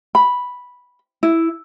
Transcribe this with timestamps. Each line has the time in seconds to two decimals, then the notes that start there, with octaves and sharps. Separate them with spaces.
0.15 B5
1.23 E4